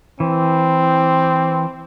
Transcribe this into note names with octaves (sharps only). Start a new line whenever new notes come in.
E3 C4